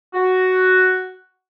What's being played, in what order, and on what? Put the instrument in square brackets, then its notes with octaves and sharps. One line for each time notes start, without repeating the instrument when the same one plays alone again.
[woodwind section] F#4